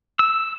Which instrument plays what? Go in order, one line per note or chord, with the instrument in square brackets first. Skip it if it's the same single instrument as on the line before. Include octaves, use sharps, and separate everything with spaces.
[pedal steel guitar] E6